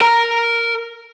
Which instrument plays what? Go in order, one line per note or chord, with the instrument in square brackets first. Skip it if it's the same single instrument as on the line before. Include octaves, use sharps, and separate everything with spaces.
[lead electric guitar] A#4 A#5